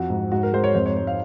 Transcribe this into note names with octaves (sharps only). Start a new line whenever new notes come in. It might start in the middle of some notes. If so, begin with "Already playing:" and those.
Already playing: F2 F3 F#4
G#2
G#2 F#4
A#4
G#3 C5
C#5
F2 C5
C#5
G#3 C#5
F5